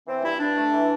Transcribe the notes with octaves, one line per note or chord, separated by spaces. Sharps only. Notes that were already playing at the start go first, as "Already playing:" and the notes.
E3 C4
G2 E4
G2 D4
A3
E3